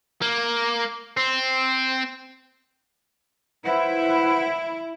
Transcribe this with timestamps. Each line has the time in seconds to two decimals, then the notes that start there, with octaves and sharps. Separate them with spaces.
0.22 A#3
1.17 C4
3.65 E4 B4 C5 F#5